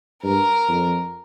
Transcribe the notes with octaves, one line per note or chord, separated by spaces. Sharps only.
G2 A#4
F2